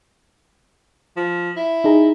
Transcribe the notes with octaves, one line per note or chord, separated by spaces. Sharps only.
F3
E4
D#4 G#4 A#5